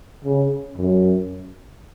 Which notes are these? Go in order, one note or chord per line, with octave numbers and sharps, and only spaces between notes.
C#3
F#2